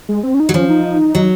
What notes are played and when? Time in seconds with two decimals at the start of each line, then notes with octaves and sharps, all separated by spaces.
0.09 G#3
0.23 C4
0.34 C#4
0.40 D#4
0.49 F#3
0.54 F3 C#4
0.69 D#4
1.15 F#3